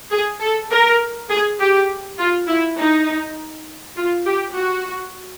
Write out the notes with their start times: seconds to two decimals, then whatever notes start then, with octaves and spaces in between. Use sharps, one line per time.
0.11 G#4
0.40 A4
0.71 A#4
1.30 G#4
1.59 G4
2.19 F4
2.48 E4
2.78 D#4
3.96 F4
4.26 G4
4.55 F#4